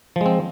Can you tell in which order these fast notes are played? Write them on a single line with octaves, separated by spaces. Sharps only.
F3 G#3 C4